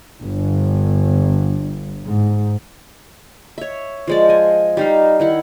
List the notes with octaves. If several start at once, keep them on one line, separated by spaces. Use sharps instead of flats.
G1
G#2
C#5 E5
F3 G#3 D5
D#5 G#5
G3 D#4 F5
D#3 E4 F#5